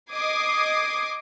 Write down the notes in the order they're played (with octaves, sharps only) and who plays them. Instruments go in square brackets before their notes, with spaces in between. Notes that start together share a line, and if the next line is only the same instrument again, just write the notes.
[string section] D#5 D6 D#6 G#6 C7